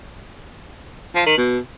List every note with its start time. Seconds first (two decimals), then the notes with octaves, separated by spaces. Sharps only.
1.15 F3
1.26 D#3
1.38 B2